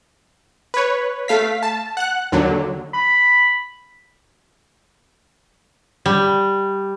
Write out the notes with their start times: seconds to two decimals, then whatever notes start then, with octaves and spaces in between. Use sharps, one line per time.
0.74 B4 C#5
1.28 A3 F5 B6
1.63 A5
1.97 F#5 F#6
2.32 D#2 D3 F#3
2.94 B5
6.06 G3